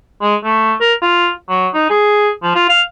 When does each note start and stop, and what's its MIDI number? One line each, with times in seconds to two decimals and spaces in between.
0.22 0.36 56
0.44 0.74 57
0.81 0.94 70
1.02 1.30 65
1.49 1.68 54
1.74 1.87 63
1.90 2.30 68
2.43 2.55 53
2.55 2.68 65
2.69 2.82 77